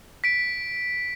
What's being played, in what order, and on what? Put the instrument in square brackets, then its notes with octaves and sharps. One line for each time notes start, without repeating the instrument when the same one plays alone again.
[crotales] B6 D7